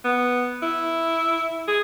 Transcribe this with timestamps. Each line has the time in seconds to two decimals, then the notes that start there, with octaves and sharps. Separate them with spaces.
0.05 B3
0.62 E4
1.68 G#4